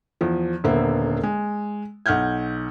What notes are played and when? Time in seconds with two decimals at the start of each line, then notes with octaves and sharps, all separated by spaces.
0.21 E2 F3
0.64 D#1 D3 A#3 B3 C5 E5
1.23 G#3
2.06 B1 F#5 F6 G6 G#6